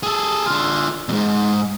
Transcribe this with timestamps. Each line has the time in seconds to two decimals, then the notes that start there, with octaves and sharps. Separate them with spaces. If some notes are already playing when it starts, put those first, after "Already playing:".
0.03 G#4 A4
0.46 D3 F4
1.09 F2 G#2